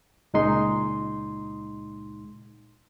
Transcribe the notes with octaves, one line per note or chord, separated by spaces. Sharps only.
C#2 A#2 G#3 D#4 C6